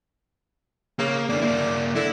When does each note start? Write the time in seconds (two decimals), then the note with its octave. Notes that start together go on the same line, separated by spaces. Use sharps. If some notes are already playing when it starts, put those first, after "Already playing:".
0.99 C#3 A#3
1.30 D3 A#3 D5
1.41 A#3 E4
1.96 D3 E4